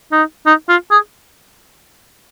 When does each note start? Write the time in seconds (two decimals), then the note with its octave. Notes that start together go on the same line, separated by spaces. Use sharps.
0.12 D#4
0.46 D#4
0.69 F4
0.91 G#4